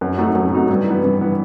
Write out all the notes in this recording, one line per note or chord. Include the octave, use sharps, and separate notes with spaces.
F#2
F#3 A3 D#4 F#4
F#2
F#3 A3 D#4 F#4
G2
E3 B3
G2
E3 B3